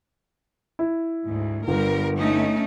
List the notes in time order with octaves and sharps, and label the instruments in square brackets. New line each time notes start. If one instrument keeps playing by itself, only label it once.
[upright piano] E4
[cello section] D2 G#2
[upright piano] G1 [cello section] G3 A#4
[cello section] A3 C#4 D#4